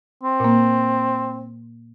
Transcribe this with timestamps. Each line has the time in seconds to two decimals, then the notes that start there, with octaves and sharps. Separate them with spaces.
0.23 C4
0.40 A#2 A#3